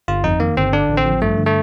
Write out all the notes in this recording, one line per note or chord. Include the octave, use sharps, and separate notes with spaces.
G1 F4
F2 D#4
D#3 A#3
G1 C4
D3 D4
A1
C4
F3
G2 A3
D3
A3